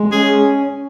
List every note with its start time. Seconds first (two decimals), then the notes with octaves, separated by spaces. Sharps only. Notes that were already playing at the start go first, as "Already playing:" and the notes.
Already playing: G#3
0.11 C#4 G#4